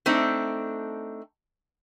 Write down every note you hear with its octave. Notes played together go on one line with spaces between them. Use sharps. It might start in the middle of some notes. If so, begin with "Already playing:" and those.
A3 C4 D4 D#4